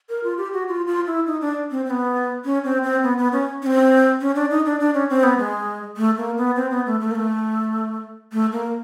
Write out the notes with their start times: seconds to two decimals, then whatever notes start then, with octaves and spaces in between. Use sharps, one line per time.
0.09 A#4
0.24 F4
0.38 G4
0.53 F#4
0.68 F4
0.87 F4
1.07 E4
1.27 D#4
1.41 D4
1.71 C4
1.86 C4
1.90 B3
2.45 C#4
2.64 C4
2.83 C4
3.03 B3
3.18 B3
3.33 C#4
3.62 C#4
3.66 C4
4.21 C#4
4.35 D4
4.51 D#4
4.66 D4
4.80 D4
4.94 C#4
5.10 C4
5.23 B3
5.38 G#3
5.97 A3
6.17 A#3
6.37 B3
6.56 C4
6.71 B3
6.86 A3
7.00 A3
7.11 A#3
7.15 A3
8.32 A3
8.53 A#3